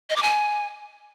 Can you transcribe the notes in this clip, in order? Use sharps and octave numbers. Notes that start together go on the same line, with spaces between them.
D#5
D6
G#5